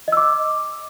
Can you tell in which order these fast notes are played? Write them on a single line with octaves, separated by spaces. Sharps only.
D#5 E6 D6